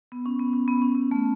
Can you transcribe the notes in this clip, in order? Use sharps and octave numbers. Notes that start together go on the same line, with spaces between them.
B3
C#4
B3
C#4
B3
C#4
B3
A3